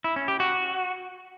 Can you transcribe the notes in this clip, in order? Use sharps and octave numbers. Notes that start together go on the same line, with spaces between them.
E4
C#4
G4
F#4